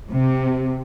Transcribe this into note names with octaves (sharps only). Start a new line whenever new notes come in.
C3